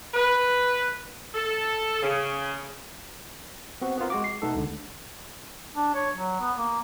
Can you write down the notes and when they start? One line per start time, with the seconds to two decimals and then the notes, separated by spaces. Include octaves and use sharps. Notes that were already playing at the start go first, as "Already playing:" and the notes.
0.14 B4
1.35 A4
2.02 C#3
3.81 B3 C4 F#4
3.98 B3 C4 F4 A#4
4.10 G#3 F#4 D6
4.24 C7
4.42 B2 A3 B3 D#4 A4
4.55 C#2 D3
5.75 D4
5.95 C#5
6.15 F#3
6.41 B3
6.58 A#3